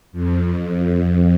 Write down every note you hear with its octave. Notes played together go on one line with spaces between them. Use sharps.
F2